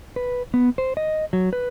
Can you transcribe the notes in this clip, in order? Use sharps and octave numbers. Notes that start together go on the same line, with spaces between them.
B4
B3
C5
D#5
F#3
B4